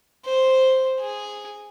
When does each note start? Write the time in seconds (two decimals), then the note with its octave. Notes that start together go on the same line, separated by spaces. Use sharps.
0.25 C5
1.00 G#4